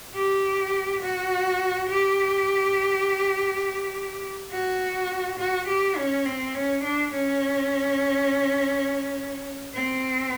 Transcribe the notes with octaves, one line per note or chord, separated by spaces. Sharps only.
G4
F#4
G4
F#4
F#4
G4
C#4
C4
C#4
D4
C#4
C4